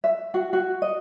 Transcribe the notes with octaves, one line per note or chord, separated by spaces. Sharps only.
E5
F#4
F#4
D#5